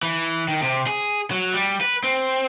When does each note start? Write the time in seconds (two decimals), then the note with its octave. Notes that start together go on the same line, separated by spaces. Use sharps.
0.03 E3
0.48 D#3
0.62 C3
0.87 G#4
1.31 F#3
1.54 G3
1.81 B4
2.04 C4